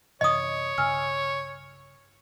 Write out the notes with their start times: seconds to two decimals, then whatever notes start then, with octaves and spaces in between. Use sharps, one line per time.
0.21 F#2 C3 E3 C#5 D#5 D#6
0.78 B1 G2 C#3 G#5 E6 F6